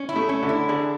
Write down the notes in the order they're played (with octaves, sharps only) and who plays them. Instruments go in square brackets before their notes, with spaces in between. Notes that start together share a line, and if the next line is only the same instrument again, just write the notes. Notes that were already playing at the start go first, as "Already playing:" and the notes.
Already playing: [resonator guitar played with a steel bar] C#4
E4
[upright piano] A3
[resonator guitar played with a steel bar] C#4
[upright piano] D3 D4
[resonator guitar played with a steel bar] E4
[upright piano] D3 D4 [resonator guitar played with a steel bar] G#4